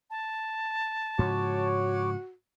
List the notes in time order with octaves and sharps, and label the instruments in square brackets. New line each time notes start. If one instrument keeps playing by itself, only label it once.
[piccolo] A5
[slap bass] G#2 C#3 F3 [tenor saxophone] F#4 [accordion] C#5 D6